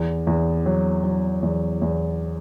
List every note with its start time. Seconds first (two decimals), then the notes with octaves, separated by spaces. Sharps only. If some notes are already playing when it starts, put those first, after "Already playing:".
Already playing: E2
0.27 E2
0.66 F#3
1.04 F#3
1.43 E2
1.82 E2